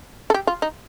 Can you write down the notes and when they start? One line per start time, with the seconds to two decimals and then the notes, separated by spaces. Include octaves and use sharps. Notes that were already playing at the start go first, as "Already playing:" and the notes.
0.30 A4
0.34 G4
0.47 F4
0.62 D#4